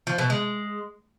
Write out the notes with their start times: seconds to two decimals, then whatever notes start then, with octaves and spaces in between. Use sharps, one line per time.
0.07 F3
0.18 B2
0.30 G#3